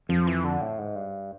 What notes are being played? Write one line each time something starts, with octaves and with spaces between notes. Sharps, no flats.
F2 F3
E3
D3
A2
G#2
G2